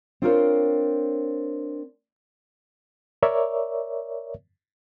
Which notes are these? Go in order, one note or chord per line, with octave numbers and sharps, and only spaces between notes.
C4 D4 F4 A#4 C5 C#5
A#4 C#5 D5 E5